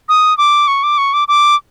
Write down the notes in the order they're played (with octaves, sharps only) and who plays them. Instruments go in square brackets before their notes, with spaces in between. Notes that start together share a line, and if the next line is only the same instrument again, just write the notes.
[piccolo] D#6
D6
C#6
D6
C#6
D6
D6